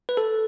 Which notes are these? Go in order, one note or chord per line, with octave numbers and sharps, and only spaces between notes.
B4
A4